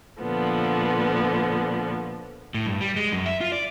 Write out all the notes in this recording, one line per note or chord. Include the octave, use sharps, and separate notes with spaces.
A#2 D3 F3 B3
A2
G2
G3
G#3
F#2
E5
F4
D5